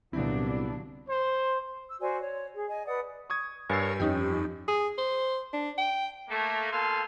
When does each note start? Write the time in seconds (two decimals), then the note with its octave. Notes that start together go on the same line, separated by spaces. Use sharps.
0.13 C2 A#2 D3 F#3 B3 C4 D4 E4
1.08 C5
1.87 E6
2.00 F#4 C5 D5 G#5
2.20 C#5
2.55 G#4
2.69 D#5 G#5
2.86 B4 D5 F#5 D#6
3.30 C#6 D#6 G#6
3.70 G2 A#4 C#5 G#5 E6 A6 C7
4.00 F2 C#4 D#4 G4
4.68 G#4
4.98 C5
5.53 D4
5.78 G5
6.29 A3 A#3
6.72 B2 A#3 A4 F5 G#5 C6